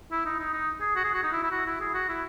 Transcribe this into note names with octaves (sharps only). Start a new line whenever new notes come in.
E4
D#4
D#4
D#4
G#4
F#4
G#4
F#4
D#4
E4
E4
F#4
E4
G#4
F#4
E4